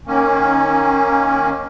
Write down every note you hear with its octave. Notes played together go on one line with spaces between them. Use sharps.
D#3 A#3 C#4